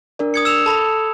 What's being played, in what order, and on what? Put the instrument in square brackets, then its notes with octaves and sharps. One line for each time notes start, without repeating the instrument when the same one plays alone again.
[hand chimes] D4 A#4 D5
[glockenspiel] D#6 G#6 C#7
E6 E7 F7
[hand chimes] A4 [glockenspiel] A5 B5